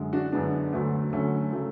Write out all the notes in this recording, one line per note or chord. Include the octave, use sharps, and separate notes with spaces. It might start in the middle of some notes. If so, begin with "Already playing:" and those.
Already playing: F#2 D3 G#3
D4 F#4
F#2 D3 G#3 B3 D4
D2 D3 F#3 A3
D2 D3 F#3 A3 C#4
C#3 F#3 A3